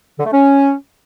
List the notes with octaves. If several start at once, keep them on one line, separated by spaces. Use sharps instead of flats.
D3
A3
C#4